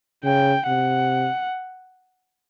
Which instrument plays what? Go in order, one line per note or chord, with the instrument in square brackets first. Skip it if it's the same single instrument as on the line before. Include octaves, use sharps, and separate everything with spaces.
[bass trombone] C#3 [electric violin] G5
[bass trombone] C3 [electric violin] F#5